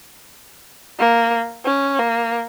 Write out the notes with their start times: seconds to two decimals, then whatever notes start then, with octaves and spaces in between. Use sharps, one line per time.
0.99 A#3
1.66 C#4
1.99 A#3